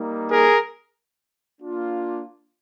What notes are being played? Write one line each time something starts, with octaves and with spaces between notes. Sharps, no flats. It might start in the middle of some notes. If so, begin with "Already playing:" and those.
Already playing: G3 A#3 D#4
G#4 A#4
A#3 D4 F4